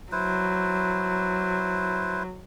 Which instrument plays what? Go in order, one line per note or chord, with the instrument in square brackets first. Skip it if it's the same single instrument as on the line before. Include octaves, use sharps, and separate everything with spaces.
[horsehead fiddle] F#3 [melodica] E4 B4 C5